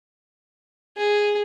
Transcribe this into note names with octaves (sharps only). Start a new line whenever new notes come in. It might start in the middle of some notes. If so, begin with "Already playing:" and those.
G#4